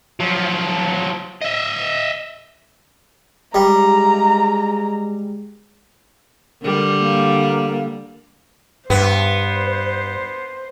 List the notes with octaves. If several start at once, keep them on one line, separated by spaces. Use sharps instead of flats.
F3 F#3
D#5 E5
G3 G#3 A#5
D3 G3 A#4
A#3
G2 B3 C5